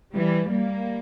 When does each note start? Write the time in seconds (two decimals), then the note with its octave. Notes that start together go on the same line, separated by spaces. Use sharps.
0.15 E3 G3
0.50 G3 A#3